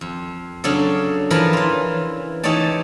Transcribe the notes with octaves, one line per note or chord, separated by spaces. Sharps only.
F2
C#3 F#3 D4 A4
E3 F3 A#4 A5 B5
E3 F4
E3 D#4 G4 C#5 D5 A5